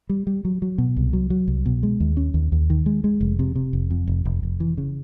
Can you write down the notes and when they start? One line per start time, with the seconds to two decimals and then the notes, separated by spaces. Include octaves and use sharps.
0.09 G3
0.27 G3
0.45 F#3
0.62 F#3
0.78 B2
0.97 C2
1.13 F#3
1.30 F#3
1.48 C2
1.66 B2
1.83 G#3
2.00 D#2
2.17 C#4
2.34 D#2
2.52 D#2
2.70 D#3
2.86 G#3
3.04 G#3
3.21 F1
3.39 C3
3.56 C3
3.73 F1
3.91 F2
4.08 F1
4.25 F1
4.43 F1
4.60 E3
4.78 C#3